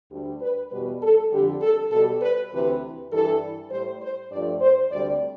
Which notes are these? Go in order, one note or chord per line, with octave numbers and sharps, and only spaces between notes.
D2 D3 G3
B4
E2 B2 G3 B4
A4
F2 D3 G3 G4
A4
B2 G3 A4
B4
D2 C3 E3 B4
G2 E3 G3 A4
A2 G3 C5
C5
G2 F3 A3 D5
C5
D2 C3 G3 D5